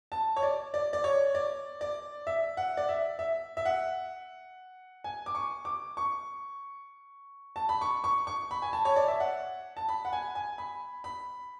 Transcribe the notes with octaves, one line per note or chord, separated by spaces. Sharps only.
A5
C#5
D5
D5
D5
C#5
D5
D5
E5
F#5
D5
E5
E5
E5
F#5
G#5
D6
C#6
D6
C#6
A5
B5
C#6
C#6
C#6
B5
G#5
A5
C#5
D5
E5
F#5
A5
B5
F#5
G#5
G#5
B5
B5